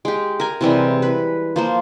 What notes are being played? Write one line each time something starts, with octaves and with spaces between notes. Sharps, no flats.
G#3 G4
A#4 G#5
C3 E3 G3 G#3
B4
F3 A#3 C5